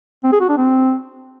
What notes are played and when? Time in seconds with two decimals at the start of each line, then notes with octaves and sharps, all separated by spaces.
0.24 C4
0.32 G#4
0.41 F#4
0.49 D4
0.57 C4